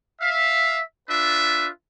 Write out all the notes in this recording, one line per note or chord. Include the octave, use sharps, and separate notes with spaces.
E5 F5
D4 F4 B4 E5